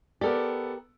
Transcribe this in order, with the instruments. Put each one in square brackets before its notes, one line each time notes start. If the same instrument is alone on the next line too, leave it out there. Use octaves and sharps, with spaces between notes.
[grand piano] B3 A4 D5 [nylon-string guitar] G4 A#4